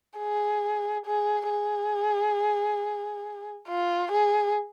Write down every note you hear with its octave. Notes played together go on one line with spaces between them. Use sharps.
G#4
G#4
G#4
F4
G#4